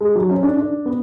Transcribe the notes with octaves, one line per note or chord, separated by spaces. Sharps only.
G#3
F#3
C#4
D4
D4
B3